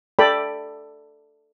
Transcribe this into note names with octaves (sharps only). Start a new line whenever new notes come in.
A4 D5 G5 B5